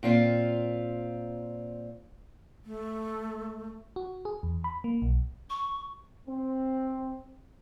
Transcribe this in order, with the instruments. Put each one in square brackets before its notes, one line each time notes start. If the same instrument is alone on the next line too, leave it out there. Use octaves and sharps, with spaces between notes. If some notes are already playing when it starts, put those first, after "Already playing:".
[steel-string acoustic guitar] A#2 C4 F4
[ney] A3
[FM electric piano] F#4
G#4
E2
B5
A#3
B1
[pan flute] C#6
[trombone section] C4